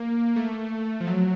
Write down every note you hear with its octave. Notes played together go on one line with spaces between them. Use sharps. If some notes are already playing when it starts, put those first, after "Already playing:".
Already playing: A#3
A3
F3
F#3